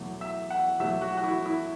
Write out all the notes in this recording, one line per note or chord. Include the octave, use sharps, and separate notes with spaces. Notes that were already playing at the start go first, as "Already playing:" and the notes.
Already playing: E2 B2 F#3 A3
E5
F#5
E2 B2 F#3 A3 E5
F#4
F#4
E4
E4